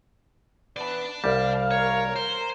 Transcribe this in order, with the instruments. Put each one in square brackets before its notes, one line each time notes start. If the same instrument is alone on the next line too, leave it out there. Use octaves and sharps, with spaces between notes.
[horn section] E3 B3 B4 [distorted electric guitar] D5 A5
[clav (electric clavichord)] C2 G3 [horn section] F5
[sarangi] A#4 [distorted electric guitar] C#5
[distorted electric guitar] C5